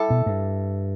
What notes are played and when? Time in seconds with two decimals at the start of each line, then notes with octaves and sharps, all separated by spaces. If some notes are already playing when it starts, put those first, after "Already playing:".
Already playing: G3 E4 A4
0.10 B2
0.26 G2